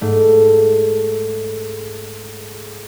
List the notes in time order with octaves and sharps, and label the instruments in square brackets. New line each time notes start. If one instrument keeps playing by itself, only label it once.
[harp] G#2 A3